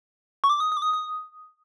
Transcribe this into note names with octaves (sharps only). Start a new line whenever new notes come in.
C#6
D6
D#6
D#6
D6
D#6
D#6